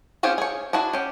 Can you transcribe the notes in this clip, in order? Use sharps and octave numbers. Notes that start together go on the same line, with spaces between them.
C4 C#4 F4 G4 G#4
G#4 C#5
D4 E4 F#4 G#4
C#4 G4